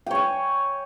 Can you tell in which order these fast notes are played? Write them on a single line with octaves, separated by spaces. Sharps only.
G5 C#5 G#5